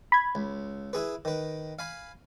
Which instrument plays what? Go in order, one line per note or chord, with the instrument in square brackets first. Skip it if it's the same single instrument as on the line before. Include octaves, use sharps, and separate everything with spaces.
[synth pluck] B5 G#6
[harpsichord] C#2
E4 G#4 B4
D#3 B4
F5 G#5 B5